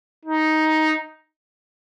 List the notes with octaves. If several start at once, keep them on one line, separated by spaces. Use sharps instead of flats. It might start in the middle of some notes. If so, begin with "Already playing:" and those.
D#4